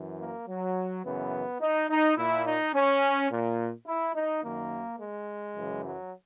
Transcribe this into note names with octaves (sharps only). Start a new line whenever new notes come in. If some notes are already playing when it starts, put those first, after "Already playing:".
Already playing: F#2 E3
A#3
F#3
F#2 C#3 E3 B3
D#4
D#4
A#2 E4
D#4
C#4
A#2
E4
D#4
F#2 D#3 A#3
G#3
F#2 C#3 E3
F#3